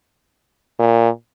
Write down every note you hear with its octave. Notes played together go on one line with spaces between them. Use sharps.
A#2